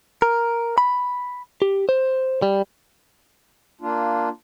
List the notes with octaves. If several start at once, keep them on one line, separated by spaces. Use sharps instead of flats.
A#4
B5
G4
C5
G3
A#3 D4 F4